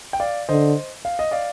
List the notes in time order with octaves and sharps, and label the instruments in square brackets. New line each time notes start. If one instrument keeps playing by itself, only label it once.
[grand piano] G5
D5 F5
[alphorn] D3 [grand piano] C5 D#5
[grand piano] F5
D#5
D5 F5